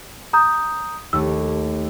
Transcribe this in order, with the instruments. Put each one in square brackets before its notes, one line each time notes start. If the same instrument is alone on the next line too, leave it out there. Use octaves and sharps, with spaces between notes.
[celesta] A#5 D#6 G6
[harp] D#2 A3 [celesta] E6